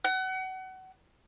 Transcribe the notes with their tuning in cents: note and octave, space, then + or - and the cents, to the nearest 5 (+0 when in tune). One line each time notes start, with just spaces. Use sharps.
F#5 +30